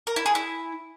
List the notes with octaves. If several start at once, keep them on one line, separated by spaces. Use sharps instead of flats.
A#4
E4
G#4
E4